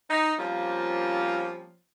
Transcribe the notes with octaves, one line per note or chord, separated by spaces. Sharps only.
D#4
F3 G3 A#3 C4 C#4 F4